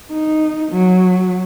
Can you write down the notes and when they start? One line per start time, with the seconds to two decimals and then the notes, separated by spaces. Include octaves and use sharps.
0.12 D#4
0.72 F#3